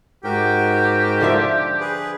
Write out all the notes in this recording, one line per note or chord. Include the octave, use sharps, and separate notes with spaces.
G#2 F#4 G4 A#4 G5
D3 F3 E5
G#4 B4